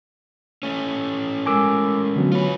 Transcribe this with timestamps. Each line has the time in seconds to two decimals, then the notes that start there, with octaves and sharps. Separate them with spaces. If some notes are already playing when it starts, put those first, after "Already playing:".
0.63 A3 C#4
1.46 G#3 A#4 G#5 D6 E6
2.16 D3 F#3 B3
2.32 F4 B4 C#5